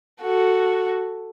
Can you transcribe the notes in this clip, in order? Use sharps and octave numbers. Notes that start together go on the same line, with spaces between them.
F#4 A4